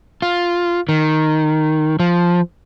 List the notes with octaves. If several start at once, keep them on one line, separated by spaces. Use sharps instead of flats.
F4
D#3
F3